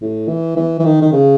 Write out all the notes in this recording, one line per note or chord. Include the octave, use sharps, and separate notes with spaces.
A2
E3
E3
E3
D#3
D#3
C#3